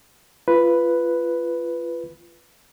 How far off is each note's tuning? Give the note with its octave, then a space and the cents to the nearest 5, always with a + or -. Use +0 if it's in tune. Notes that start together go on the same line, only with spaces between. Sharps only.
F4 -25 B4 +0